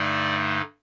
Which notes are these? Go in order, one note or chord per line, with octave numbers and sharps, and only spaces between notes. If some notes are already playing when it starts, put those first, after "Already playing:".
Already playing: G2 D3 A3 D#4 D5